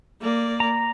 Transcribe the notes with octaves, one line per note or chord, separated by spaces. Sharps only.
A#3 D5
A#5